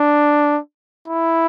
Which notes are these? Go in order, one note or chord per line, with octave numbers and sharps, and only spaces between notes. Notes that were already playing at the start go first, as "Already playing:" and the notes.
Already playing: D4
E4